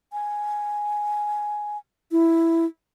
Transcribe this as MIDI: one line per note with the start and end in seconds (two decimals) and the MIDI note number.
0.13 1.78 80
2.12 2.65 64